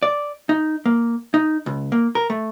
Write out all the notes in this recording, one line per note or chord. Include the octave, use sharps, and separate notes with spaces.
D5
D#4
A#3
D#4
C#2
A#3
A#4
A3